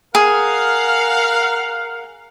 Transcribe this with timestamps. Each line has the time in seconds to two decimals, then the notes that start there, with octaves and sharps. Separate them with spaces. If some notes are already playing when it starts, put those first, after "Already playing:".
0.15 G#4 A#4 F5 F#5